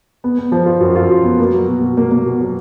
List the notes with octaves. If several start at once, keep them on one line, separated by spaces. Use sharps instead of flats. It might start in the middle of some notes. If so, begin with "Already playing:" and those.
B3
B3
F3
F4
F#2
F4
F#2
B3
A#3
F#3
B2
B2
A#3
A#3
B2
F#3